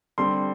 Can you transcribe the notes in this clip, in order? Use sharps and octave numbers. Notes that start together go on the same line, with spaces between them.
D3 G3 C4 C6